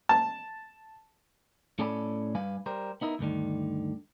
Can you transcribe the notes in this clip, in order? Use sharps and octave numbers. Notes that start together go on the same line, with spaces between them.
A5
A2 C#4 A4 D5 G#5 B5
G2 G3 B4 F5 G#5
G3 A#4 C5
B3 D#4 E4 A#4
D2 G2 D3 D#3